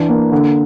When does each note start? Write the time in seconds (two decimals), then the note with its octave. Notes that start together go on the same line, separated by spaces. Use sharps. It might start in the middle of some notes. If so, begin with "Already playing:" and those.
Already playing: E3 D4
0.09 A#3
0.32 D3